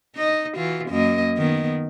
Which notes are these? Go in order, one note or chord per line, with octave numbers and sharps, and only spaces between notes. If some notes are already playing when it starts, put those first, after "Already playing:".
D#4 D#5
E3 F4 F#4
F#2 A#3 D#5
D#3 B3